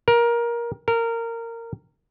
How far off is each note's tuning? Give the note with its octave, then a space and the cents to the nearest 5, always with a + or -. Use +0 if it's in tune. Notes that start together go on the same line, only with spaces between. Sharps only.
A#4 +15
A#4 -20